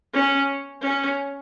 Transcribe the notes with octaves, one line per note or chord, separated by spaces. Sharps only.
C#4
C#4